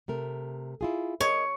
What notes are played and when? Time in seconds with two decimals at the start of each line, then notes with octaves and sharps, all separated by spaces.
0.08 C3 A3 A#4
0.81 E4 F4 G#4
1.21 A#4 C#5 D#5